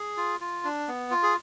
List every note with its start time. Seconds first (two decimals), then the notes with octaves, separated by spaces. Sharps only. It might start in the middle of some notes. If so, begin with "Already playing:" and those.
Already playing: G#4
0.17 F4
0.40 F4
0.64 D4
0.88 B3
1.11 F4
1.23 G#4